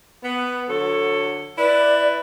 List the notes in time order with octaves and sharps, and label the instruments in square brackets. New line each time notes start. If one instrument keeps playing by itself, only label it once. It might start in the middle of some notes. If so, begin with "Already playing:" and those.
[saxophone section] B3
D3 F#3 A4
[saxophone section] E4 B4 [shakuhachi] D5